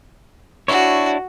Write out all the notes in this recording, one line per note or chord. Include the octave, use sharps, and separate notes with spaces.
D4 E4 F#4 C#5